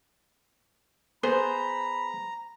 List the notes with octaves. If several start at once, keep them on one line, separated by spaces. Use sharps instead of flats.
B3 G#4 C5 A#5 B5